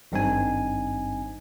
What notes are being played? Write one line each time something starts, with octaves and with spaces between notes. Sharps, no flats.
G#1 G2 G3 C4 D#4 G#5